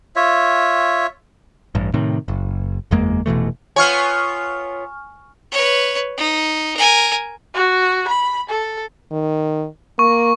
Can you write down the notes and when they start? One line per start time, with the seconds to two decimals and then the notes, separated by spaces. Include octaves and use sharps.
0.16 F4 C#5 E5
1.75 A1 G2
1.94 A2 C3 D#3
2.28 F#1
2.91 F#1 E2 G#3 A#3
3.26 F1 B2 E3 A3
3.76 B3 F4 C#5 G#5 C#6 F6
5.52 B4 C#5
6.17 D#4
6.77 A#4 G#5
7.55 F#4
8.08 B5
8.49 A4
9.12 D#3
9.99 A#3 C#6